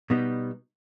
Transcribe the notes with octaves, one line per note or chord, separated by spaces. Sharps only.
B2 G3 B3 D#4